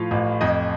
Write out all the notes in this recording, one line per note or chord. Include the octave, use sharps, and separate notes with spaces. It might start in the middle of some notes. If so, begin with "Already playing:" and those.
Already playing: A2 F3 F5
A1
F2 D#5